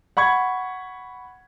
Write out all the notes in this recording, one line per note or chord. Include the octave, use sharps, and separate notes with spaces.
F#5 B5 C#6 G#6